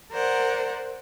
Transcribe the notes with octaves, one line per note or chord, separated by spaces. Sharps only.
A#4 C5 D5 F#5